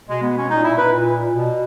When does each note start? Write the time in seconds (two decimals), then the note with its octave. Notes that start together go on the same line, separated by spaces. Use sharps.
0.08 B2 G#3
0.22 B3
0.36 C#4
0.50 A#2 D#4
0.64 E4
0.78 B4
0.93 A#2
1.34 B2